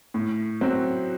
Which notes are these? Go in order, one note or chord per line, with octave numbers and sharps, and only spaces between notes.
A2
F#3 C4 F#4